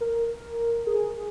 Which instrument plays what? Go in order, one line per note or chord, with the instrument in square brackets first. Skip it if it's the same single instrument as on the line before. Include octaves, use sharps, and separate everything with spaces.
[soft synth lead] A#4
G#4